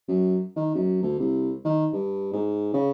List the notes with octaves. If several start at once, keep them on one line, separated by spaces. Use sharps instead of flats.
F#2
D#3
F#2
D2
C2
D#3
G2
G#2
C#3